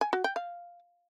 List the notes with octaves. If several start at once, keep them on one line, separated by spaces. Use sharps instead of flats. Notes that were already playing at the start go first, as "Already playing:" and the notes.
G#5
F#4
G5
F5